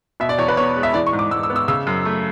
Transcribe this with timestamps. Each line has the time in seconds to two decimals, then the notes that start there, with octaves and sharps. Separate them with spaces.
0.20 B2 E5
0.29 D5
0.38 E2 C#5
0.48 B4
0.57 B3 C#5
0.76 G#3
0.83 E5
0.94 E3 D5
1.07 C#6
1.13 G#2
1.19 D6
1.31 G#2 E6
1.43 E6
1.50 B3
1.56 E6
1.68 C#3 E6
1.87 F#2
2.05 A3